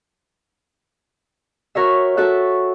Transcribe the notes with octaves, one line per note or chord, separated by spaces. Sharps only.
F#4 A#4 C#5 E5
F#4 A4 E5 F#6